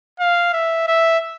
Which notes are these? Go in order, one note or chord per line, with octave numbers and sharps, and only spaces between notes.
F5
E5
E5